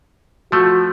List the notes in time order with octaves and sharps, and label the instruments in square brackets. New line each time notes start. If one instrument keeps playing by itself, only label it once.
[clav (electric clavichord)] F3 A3 [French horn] F#4